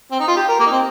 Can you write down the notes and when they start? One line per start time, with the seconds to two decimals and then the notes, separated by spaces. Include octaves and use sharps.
0.11 C4
0.20 D#4
0.28 F4
0.37 G4
0.49 A#4
0.60 A#3
0.66 D#4
0.71 C4